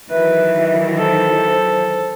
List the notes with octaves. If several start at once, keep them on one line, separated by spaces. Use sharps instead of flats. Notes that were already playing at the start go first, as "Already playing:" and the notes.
D#3 E3 F#3 B4 E5
A4 C5